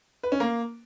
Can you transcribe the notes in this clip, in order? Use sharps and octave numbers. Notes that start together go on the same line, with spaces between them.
B4
C#4
A#3